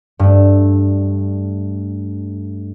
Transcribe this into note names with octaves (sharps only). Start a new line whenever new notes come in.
G2 A3